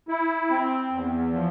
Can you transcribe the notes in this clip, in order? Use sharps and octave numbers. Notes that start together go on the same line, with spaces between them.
E4
C4
E2
F3